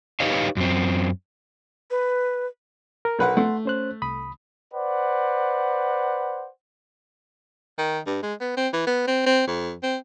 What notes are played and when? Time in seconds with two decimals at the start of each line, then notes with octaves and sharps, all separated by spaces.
0.20 D#4 G4 B4 C#5 D#5 F5
0.57 F#2 C4
1.91 B4
3.05 A#4
3.19 B1 B4 F#5
3.37 A3 F#5 C6
3.65 C#4 C5 F#6
4.02 C2 B5 D#6
4.74 B4 C5 D5 F#5
7.78 D#3
8.07 G2
8.23 G#3
8.41 B3
8.57 C4
8.73 E3
8.87 B3
9.07 C4
9.26 C4
9.47 F2
9.83 C4